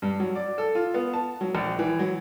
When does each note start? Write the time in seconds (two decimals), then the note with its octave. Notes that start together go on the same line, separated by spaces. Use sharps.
0.02 G2
0.20 F#3
0.35 D5
0.58 A4
0.75 F4
0.94 B3
1.13 A5
1.41 F#3
1.55 A#1
1.79 E3
1.99 F#3